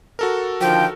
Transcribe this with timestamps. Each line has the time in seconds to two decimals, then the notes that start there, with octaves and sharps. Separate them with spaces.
0.19 F#4 A4 A#4
0.61 D3 D#3 F3 G5